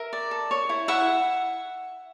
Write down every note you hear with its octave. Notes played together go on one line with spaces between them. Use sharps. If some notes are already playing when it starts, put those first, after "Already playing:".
Already playing: A#4 E5
D5
A4
C#5
E4
E4 E5 F#5